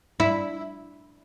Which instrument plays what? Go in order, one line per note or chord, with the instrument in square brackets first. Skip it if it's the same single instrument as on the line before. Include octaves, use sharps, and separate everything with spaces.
[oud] E4